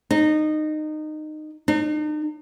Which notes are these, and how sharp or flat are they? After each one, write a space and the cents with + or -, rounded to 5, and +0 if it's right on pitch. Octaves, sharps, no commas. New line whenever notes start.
D#4 -20
D#4 -40